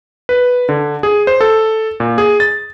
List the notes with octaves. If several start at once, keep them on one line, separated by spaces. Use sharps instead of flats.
B4
D3
G#4
C5
A4
A#2
G#4
A6